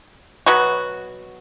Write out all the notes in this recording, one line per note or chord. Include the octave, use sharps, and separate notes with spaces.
B2 F#3 B3 F#4